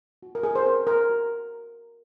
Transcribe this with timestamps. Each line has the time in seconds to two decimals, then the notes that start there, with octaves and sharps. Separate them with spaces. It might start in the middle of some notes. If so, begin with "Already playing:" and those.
0.23 F#4
0.35 A#4
0.43 G#4
0.55 C5
0.65 C4 A#4
0.87 A#4
1.10 F#4